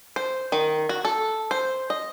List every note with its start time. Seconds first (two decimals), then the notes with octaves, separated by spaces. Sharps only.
0.16 C5
0.52 D#3
0.89 F#4
1.05 A4
1.51 C5
1.90 D#5